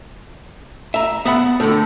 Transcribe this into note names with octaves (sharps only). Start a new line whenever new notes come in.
E5 A#5
B3 E5 F#5 B5
A2 D3